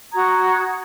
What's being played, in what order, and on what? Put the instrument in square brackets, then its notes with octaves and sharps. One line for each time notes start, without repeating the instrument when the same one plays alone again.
[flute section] F#4 A#5 D#6 G#6